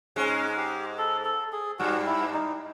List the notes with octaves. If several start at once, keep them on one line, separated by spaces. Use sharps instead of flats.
G#2 G#3 C#4
G4
A4
A4
G#4
G2 G3 F#4
E4
D#4